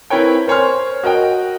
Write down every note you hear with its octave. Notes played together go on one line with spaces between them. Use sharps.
C4 E4 A#4 B4 C#5 G5
A#4 C5 C#5 G#5 C6 F6
F#4 A#4 D#5 G5